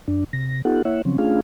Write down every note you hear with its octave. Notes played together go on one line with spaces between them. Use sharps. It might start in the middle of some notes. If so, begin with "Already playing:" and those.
F#2 D4
C3 A#6
B3 D#4 F4 G4 A4 F#5
A#3 E4 C#5 E5 F#5
C#3 F3 F#3 C4 C#4
A3 C#4 D4 F4 G#4 F5